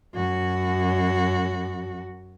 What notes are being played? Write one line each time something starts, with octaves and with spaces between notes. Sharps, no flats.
F#2 F#4